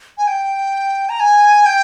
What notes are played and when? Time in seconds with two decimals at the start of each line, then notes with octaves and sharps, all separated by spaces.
0.18 G#5
0.27 G5
1.09 A#5
1.20 G#5
1.66 G5